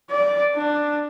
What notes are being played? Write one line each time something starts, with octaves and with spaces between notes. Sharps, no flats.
D5
D4